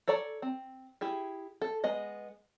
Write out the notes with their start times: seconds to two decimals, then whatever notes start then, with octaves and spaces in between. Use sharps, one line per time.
0.08 A4 C#5 D5 A#5
0.42 C4
1.01 E4 G4 G#4
1.62 A4
1.84 G#3 B3 D#5